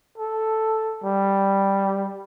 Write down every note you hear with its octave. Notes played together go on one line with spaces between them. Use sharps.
A4
G3